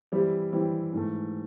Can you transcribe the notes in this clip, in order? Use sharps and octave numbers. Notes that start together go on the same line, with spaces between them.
E3 G3 C4 E4 G4
E3 G3 C4 E4 G4
G#2 E3 A3